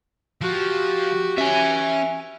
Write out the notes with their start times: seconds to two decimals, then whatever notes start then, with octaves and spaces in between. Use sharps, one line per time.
0.41 F3 F#4 G4
1.38 C#4 E5 G#5